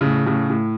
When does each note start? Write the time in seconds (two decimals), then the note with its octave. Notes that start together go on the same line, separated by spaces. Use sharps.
0.01 A2 C#3
0.26 A2 C#3
0.50 A2